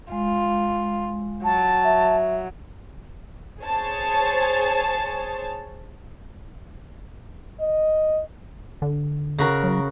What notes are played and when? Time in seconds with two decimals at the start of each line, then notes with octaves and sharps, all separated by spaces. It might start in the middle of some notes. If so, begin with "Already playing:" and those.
0.12 G#3 F4
1.44 F#3 A5
1.84 E5 F#5
3.61 G#4 C5 C#5 A5
7.60 D#5
8.82 D3
9.38 C#3 F#4 A#4
9.63 F#3